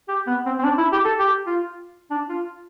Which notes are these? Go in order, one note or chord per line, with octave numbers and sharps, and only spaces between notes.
G4
B3
C4
C4
D4
E4
G4
A4
G4
F4
D4
F4